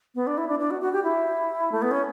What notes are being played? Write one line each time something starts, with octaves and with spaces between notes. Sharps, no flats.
B3
D4
E4
D4
D4
F#4
F#4
G4
E4
A3
B3
C#4